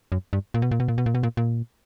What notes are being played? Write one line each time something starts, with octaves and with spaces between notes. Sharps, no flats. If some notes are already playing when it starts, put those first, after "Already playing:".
F#2
G2
A#2
B2
A#2
B2
A#2
B2
A#2
B2
A#2
A#2